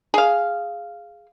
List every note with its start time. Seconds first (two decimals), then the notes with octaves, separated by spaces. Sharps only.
0.14 G#4 F5